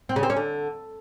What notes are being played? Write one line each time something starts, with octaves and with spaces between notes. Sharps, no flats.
C4
C#3
C4
C#4
D3